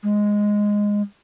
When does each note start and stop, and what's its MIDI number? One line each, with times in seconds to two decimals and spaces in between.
0.03 1.02 56